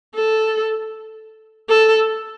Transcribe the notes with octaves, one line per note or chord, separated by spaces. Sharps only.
A4
A4